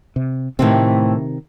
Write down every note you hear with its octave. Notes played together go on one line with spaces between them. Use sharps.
C3
A2 C3 D#3 E3 C4